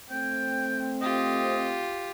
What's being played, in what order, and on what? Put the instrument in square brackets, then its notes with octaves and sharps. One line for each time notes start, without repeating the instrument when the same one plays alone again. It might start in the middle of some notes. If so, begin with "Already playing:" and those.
[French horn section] A3 C4 [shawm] G5
[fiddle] F4 G4 [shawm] D#5